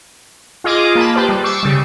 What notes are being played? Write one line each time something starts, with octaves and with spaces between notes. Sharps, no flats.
F4 G#4 D#5 D6
A#3 A5 B5
G4 B4 C5 D5
G3
C#6 D6 E6 C7
C#3 G3